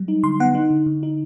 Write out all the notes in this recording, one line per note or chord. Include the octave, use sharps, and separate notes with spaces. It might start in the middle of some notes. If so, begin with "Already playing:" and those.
Already playing: F#3 G3
D#4
D3 C6
B3 F#5
D#4
D3
D3
D#4